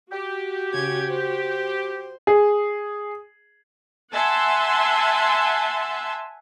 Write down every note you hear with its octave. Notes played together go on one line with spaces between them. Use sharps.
F#4 G4
C#3 C#4 G#6
C5
G#4
E5 F#5 G#5 A5 C6